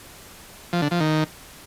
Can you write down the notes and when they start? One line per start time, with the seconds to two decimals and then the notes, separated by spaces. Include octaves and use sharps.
0.73 F3
0.82 D3
0.91 F3
1.00 D#3